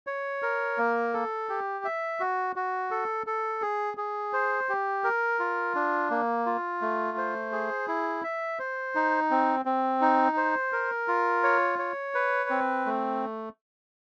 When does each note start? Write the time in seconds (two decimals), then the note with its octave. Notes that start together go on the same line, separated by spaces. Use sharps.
0.07 C#5
0.42 A#4
0.78 A#3
1.14 A4
1.49 G4
1.85 E5
2.20 F#4
2.56 F#4
2.91 A4
3.27 A4
3.62 G#4
3.97 G#4
4.33 C5
4.69 G4
5.04 A#4
5.40 F4
5.75 D4
6.11 A#3
6.46 F4
6.82 A3
7.18 C5
7.52 G#4
7.88 E4
8.24 E5
8.59 C5
8.95 D#4
9.31 C4
9.65 C4
10.01 D#4
10.37 C5
10.73 A#4
11.08 F4
11.43 C#5
11.79 C#5
12.15 B4
12.50 C4
12.86 A3